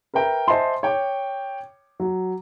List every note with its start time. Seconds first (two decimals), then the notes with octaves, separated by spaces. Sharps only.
0.14 A#4 B4 E5 G5 A#5
0.48 C5 D#5 E5 G#5 A5 C6
0.83 C#5 G5 D6
2.00 F#3